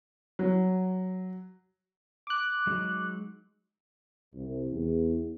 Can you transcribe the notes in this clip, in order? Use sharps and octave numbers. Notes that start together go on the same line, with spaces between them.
F#3
D6 F#6
F#3 G#3 D#4
C2
E2